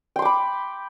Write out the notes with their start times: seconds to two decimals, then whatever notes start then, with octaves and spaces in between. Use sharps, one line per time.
0.16 G5
0.19 C6
0.22 D6
0.25 B5